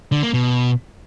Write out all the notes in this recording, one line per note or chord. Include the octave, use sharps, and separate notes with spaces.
D3
A#3
B2